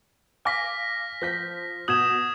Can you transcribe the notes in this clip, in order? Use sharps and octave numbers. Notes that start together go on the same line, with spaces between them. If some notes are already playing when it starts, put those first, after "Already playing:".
F5 G#5 D6 F6 A#6 B6
F3 G6 A#6 B6
B2 D#6 G6 G#6 E7 F#7